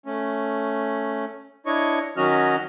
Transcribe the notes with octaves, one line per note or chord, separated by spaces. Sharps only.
A3 C#4
D4 E4 C#5 D#5 C#6
D#3 F#3 C#4 F#4 D#5 F6